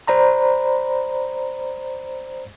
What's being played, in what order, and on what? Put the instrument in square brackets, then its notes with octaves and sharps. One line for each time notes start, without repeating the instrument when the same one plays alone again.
[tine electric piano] C5 D5 A#5 B5